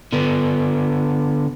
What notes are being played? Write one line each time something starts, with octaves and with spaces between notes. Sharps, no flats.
D3 B3